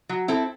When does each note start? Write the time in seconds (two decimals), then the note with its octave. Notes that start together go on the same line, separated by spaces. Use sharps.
0.09 F#3
0.28 C4 E4 A4